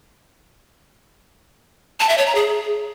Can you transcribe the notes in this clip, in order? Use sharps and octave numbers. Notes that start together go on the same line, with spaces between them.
A5
E5
C#5
A#5
G#4